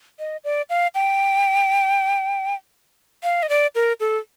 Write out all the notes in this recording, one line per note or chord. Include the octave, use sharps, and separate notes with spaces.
D#5
D5
F5
G5
F5
D#5
D5
A#4
A4